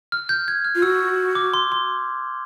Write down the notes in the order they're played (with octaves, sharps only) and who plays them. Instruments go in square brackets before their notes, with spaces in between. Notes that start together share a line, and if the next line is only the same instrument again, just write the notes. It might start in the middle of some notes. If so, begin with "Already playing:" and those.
[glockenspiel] F6
G6
G#6
F6
[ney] F4
[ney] F#4 [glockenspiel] E6
[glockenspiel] D6
C6
C6